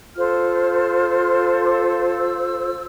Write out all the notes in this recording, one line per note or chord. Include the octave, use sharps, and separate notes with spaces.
F4 A4 C5 F6
D6
E6